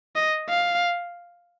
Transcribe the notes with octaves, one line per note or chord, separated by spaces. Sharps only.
D#5
F5